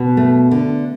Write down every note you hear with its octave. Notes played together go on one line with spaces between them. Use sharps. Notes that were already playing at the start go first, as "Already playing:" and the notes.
Already playing: B2
A3
D3